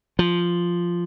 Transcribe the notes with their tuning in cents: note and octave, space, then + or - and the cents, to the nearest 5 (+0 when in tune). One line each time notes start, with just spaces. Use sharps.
F3 -5